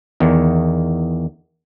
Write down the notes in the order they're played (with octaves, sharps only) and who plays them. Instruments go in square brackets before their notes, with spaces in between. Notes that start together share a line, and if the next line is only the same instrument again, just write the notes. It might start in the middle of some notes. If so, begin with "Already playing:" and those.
[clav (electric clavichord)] E2 D#3